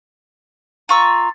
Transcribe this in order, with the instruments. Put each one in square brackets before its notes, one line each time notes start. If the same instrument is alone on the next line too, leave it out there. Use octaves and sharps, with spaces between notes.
[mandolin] F4 C#6 E6 [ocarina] A#5